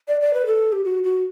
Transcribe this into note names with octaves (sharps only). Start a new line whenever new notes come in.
D5
D5
B4
A4
G4
F#4
F#4